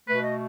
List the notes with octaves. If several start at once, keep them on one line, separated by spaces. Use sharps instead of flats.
B2 A3 B4
D#5